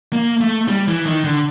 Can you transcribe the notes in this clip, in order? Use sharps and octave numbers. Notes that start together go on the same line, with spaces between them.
A#3
A3
G3
E3
D#3
D3